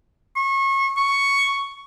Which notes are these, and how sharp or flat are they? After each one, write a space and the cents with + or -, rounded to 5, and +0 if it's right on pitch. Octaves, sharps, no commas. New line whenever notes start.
C#6 -30
C#6 +5